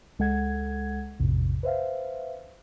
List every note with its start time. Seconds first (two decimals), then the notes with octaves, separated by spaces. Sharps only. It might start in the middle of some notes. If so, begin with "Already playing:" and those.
0.19 C#2 G#3 A4 F#5 G#6
1.20 A#1 F2 A2 C3
1.63 B4 C5 E5 F5